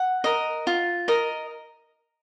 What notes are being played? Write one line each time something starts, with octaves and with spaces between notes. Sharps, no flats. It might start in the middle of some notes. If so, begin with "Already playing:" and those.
Already playing: F#5
A#4 D#5
F4
A#4 D#5